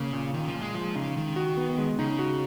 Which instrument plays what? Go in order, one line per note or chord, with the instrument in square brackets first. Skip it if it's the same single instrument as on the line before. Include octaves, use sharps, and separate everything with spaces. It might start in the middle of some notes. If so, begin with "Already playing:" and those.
Already playing: [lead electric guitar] C#3 [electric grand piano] A#3
[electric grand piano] A#2
[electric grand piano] A#2 [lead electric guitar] D#3
[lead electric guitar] F3
[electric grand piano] A#2
[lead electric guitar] G#3
[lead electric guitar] F3 [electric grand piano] G#3
[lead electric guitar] C#3 [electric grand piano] D#4
[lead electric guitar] D#3 [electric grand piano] G#3
[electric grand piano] F#4
B3
G#3
[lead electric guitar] C#3 [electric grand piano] D#4
[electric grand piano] F#4